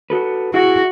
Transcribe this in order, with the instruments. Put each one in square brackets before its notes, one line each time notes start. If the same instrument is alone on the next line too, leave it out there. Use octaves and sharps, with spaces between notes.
[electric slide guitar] F#4 A4 B4
[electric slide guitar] E4 G#4 [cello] F#4